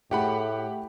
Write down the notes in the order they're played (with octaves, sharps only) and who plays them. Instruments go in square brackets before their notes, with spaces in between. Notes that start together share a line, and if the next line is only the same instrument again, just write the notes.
[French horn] A2 [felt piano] A3 G#4 G5 [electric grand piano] G4 F#5 B5